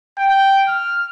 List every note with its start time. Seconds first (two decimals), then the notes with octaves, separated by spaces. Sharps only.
0.19 G5
0.68 F6